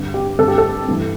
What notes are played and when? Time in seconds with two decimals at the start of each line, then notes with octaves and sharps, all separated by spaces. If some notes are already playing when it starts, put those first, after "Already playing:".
Already playing: G2 D3
0.14 G4
0.38 G2 D3 A4
0.48 G4
0.58 A4
0.88 G2 E3